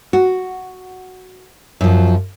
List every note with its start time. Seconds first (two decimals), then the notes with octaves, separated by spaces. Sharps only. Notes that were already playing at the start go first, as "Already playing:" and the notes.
0.13 F#4
1.81 F#2 F3